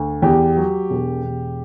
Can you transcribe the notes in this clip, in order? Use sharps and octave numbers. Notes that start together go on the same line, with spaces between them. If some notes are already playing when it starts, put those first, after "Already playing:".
Already playing: D2
E2 G4
F#3
E1
E1